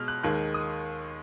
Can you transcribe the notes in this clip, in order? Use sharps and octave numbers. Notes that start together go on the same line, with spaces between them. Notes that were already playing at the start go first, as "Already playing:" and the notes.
Already playing: B2 G#3 F6
F#6
D#2 D#3 G#3 F#6
D#6